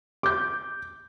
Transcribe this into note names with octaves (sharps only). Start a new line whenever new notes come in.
D6 G6